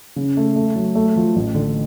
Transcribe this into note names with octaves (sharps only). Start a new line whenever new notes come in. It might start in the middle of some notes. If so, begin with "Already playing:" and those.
C#3
A3
A3
F#3
A3
F3
A1
D3